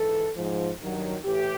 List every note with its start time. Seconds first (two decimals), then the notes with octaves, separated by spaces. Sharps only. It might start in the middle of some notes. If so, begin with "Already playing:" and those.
Already playing: G#2 E3 A4
0.36 G#2 F3
0.81 G2 D#3 F#3
1.25 A2 E3 G4